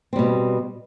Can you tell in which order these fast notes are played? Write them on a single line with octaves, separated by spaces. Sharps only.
C4 G3 B2